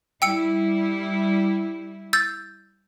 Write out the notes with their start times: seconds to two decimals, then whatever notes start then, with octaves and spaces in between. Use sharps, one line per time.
0.22 G3 E4 G5 E6 C#7
2.13 E6 G6 A6